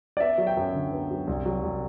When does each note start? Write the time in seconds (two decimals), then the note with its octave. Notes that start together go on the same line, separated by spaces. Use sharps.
0.17 D5
0.20 B3 E5
0.38 F#3
0.47 G5
0.57 F#2
0.74 D3
0.92 B3
1.10 F#3
1.27 C2
1.46 F#3
1.63 C2